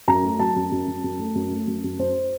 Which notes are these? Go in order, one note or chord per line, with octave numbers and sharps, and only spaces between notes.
F#2 A#5
A3
F#3 A5
F#2
F#2
F#2
F#2
A3
F#2
A3
F#2
F#2
F#2 C5